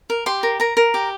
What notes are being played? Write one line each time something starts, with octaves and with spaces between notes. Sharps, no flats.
A#4
G4 C6
A#4
A#4 A#5
A#4
G4